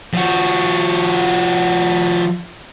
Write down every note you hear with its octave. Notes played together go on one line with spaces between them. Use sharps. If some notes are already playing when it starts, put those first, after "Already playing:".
F3 F#4